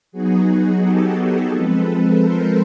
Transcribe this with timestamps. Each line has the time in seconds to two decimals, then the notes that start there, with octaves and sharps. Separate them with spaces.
0.12 F#3 B3 D#4 F#4 G#4
0.80 G4 A4
1.50 F3 G#3 C4 A4 B4
2.19 A#4 C5